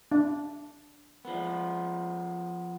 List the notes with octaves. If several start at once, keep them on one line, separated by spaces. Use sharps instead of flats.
D4
F3 B3